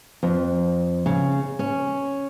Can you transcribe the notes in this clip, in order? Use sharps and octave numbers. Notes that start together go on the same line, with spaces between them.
F2
C#3
C#4